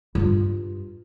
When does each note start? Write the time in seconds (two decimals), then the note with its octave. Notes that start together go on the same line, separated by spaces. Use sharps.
0.15 G2 F4